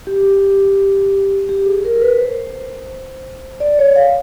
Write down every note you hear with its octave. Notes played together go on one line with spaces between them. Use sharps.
G4
G4
G#4
A#4
B4
C5
D5
C#5
F5